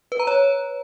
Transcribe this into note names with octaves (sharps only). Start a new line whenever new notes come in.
B4
A#5
C#5